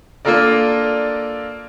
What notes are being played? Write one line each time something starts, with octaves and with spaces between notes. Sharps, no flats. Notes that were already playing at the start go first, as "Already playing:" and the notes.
A#3 D4 F4 A4 A#4 D5